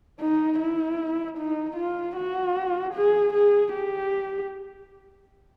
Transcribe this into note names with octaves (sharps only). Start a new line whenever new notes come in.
D#4
E4
D#4
F4
F#4
G#4
G#4
G4